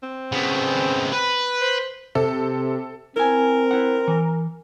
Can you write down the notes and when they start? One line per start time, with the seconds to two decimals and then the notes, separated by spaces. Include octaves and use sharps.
0.03 C4
0.32 C#3 B3
1.12 B4
1.61 C5
2.15 C3 A4
3.16 C4 E4 A#4 G#5
3.71 E4 F#5
4.08 E3